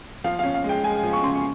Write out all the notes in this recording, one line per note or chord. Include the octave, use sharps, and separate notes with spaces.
F3 F5
C#4 F5
F5
G#3
G5
G#3 G#5
F3
C#6
C#3 C6
C#6